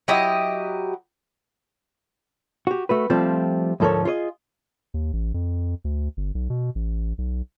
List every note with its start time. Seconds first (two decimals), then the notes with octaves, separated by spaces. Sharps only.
0.08 F#3 E4 G4 D#5
2.67 F#4 G4
2.89 A3 F#4 B4
3.10 F3 G3 A3 C4 F4
3.80 D2 G#2 F3 A4 A#4 C#5
4.05 F4 G#4 C#5 D#5
4.94 D#2
5.13 A1
5.34 F2
5.84 D2
6.17 G1
6.35 B1
6.50 B2
6.75 A1
7.18 B1